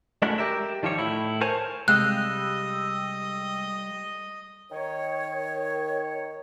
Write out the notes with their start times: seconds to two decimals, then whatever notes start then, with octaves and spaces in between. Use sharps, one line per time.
0.22 G#3 A3 C#4 D4 E4 F#4
0.38 G4 A#4 E5
0.83 D#3 F3 G3 C#5
0.99 A2 E4
1.41 A#4 C5 C#5 G#5 A5
1.88 C3 G3 G#3 D#5 F5 G5 E6 F#6
4.72 D#3 C#5